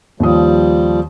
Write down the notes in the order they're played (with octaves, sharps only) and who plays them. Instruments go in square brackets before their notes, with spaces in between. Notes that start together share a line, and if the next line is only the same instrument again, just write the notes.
[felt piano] D#2 D#6 [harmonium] F3 G3